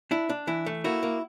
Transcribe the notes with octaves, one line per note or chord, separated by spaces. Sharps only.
D4 E4
D4
E3 E4
A3
A#3 E4 F#4
A#3